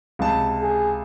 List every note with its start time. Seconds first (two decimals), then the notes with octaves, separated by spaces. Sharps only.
0.19 C#2 C3 A5
0.62 G#4